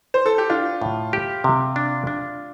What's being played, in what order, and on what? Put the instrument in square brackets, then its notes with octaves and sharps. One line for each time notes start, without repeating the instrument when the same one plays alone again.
[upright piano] C5
A4
G4
[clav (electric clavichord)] D4 [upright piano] F4
[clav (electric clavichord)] A2
G4
C3
D4
D4